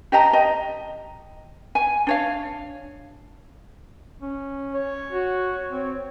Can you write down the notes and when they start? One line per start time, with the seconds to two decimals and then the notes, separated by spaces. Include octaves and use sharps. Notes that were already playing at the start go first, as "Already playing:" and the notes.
0.12 G4 D#5 A5 A#5
0.33 D#5
1.75 G#5
2.07 D4 C#5 F5
4.22 C#4
4.74 C#5
5.12 F#4
5.70 C4